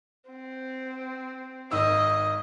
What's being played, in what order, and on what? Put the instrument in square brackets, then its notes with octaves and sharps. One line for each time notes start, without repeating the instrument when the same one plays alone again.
[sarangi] C4
[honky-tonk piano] G#1 D#3 E6 [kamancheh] D#5